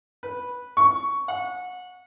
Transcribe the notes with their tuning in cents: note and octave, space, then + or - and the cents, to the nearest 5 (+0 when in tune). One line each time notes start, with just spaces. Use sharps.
B4 -10
C#6 +10
F#5 -30